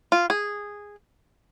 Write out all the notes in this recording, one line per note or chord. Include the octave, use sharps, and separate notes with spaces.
F4
G#4